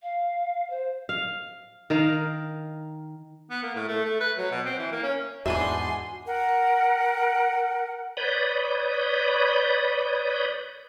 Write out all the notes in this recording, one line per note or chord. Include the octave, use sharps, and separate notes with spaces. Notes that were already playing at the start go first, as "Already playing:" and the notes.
F5
C5
F5
D#3 A#4 F5
B3
A#3
A2
A3
A3
B4
F#3
B2
C4
E3
A#3
C#4
E2 G#2 D4 F#4 B4 E5 G#5 C6
A#4 F#5 G5
B4 C#5 D5 B5 D#6 G6